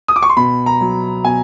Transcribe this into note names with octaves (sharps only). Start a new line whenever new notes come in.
D#6
D6
C#6
C6
B2 B5
A#5
F#3
B2 G#5